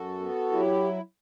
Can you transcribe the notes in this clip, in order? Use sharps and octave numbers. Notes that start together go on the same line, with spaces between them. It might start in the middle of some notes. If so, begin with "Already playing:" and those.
Already playing: F#2 F#4 A4
B3
F#3 E4 G4